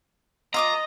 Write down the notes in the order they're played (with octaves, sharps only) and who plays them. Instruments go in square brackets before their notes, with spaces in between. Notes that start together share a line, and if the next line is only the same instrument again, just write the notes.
[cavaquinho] F4 D6 D#6 [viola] D#5 [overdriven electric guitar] A#5